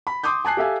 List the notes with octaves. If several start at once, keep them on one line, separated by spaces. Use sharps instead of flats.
B5
C6 D6 D#6 G6
G#5 A5 F#6 C7
G4 A4 E5 F5 G#5